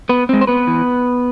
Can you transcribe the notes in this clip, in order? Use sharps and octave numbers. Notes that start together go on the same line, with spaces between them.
B3 B4
G#3 C4
C5
B3 B4
E3